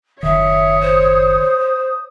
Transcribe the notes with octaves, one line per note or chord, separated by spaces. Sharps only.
F#1 B1 D#3 C#5 E5 D#6
C5